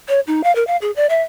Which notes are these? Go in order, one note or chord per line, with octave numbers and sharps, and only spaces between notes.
C#5
D#4
F5
A#4
F5
G#4
D5
E5